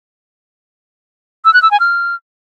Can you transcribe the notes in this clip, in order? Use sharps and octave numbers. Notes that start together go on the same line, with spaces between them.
E6
F#6
E6
G#5
F6